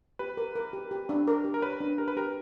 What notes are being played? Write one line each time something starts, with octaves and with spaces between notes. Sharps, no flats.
G4 B4
A#4
A#4
G4
G4
D4
A#4
G4
A#4
B4 C#5
D4
G4 A#4
B4
G4 A#4